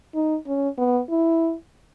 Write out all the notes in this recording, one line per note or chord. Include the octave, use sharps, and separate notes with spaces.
D#4
C#4
B3
E4